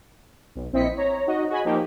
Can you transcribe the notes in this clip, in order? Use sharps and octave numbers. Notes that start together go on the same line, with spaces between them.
B1
A#1 C4 E4 D#5 B6 C#7
C#5 A#5
D#4 F#4 D#5
F#4 G#4 D#5 G#5 B5
F3 A#3 D#4 G4